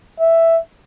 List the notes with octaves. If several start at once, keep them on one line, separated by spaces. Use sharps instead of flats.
E5